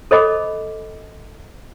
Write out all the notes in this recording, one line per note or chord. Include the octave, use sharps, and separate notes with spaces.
A4 C5 D#5 B5 D6